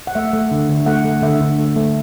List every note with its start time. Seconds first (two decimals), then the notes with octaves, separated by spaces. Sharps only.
0.07 F#5
0.15 A3 E5
0.33 A3
0.51 D3
0.69 D3
0.86 A3 F#5
1.05 A3
1.22 D3 E5
1.41 D3
1.59 A3
1.76 A3